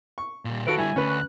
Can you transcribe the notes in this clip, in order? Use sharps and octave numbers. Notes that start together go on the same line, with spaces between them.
C#6
A#2 G3
D#3 F4 F#4 A4 B4 D7
D3 G3 E4 G#5
D2 C#4 B4
F#6